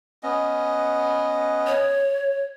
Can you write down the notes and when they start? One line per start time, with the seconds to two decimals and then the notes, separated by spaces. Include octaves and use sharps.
0.23 B3 C#4 D#5
1.67 C#5